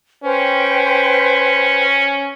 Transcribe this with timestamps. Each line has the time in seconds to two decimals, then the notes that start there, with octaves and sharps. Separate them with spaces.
0.24 C#4 B4 C5 G5